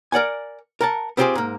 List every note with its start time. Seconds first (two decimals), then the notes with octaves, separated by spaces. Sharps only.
0.12 A#4 D5 F#5 G#5
0.81 A#4 F#5 A5
1.17 B3 C4 F4 G4 G#4 C5
1.35 G#2 A#3